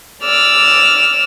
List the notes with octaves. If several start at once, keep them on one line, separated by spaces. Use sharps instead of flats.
D5 E6 F6